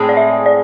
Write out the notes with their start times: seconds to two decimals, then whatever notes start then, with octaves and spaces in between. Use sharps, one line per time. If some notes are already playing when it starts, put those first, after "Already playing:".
Already playing: A2 G#3 C4 G#4
0.09 D5
0.17 E5
0.46 D5